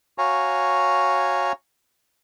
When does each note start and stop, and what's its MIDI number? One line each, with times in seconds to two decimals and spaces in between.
0.18 1.52 66
0.18 1.52 73
0.18 1.52 77
0.18 1.52 80
0.18 1.52 82